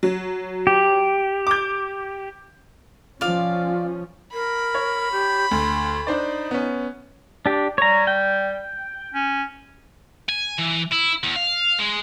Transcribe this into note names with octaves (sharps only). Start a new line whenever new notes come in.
F#3
G4
D6 G6
F3 C#4 F4 D5 F5
A#4 B5
C#5
G4
D2 C6
D4 D#4 C5 D5
B3 C#4
D4 G4
G3 C#5 A#5
G5
C#4
G#5
E3
E4
E2
F5
G#3